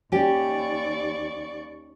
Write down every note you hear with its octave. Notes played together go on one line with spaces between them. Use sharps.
D#2 C#4 G4 D5 C#6